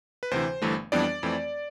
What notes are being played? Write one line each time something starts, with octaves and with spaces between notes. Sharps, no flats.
B4
D2 C3 E3 C5
G1 G2 E3 A3
F2 E3 G3 B3 D4 D5
F2 E3 A3 C4